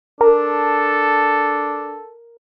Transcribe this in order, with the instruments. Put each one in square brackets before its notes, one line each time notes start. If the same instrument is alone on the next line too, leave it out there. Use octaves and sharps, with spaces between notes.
[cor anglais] D4 [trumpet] A4 [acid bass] A#4